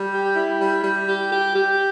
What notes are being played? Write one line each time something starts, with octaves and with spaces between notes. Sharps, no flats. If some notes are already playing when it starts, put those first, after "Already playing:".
Already playing: G3
G4
E4
G3
G3
G4
G4
G4